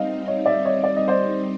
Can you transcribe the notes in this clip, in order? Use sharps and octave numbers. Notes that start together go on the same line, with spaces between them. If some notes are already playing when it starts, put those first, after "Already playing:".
Already playing: G3 C4 D#4 D#5 F5
C#5 D#5
D5 E5
C#5 D#5
D5
D#5
C5 D5